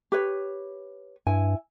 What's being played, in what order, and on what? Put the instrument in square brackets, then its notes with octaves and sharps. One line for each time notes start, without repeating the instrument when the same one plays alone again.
[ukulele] G4 B4 C#5
[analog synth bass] G2 [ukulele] E4 G#5